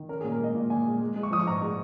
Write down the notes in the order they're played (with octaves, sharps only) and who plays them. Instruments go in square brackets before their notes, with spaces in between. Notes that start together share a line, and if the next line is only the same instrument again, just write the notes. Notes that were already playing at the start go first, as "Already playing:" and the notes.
Already playing: [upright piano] D#3
C#4 A#4
G#4
A#2
A#4
G#3 D#5
A#2
A#2 G#5
G#3
G#3
G#3
C#6
F3 D#6
C#6
G#2 A#5
G#3